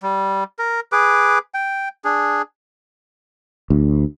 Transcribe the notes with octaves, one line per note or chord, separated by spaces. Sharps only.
G3
A#4
G#4 B4 D6
G5
D4 G#4
D2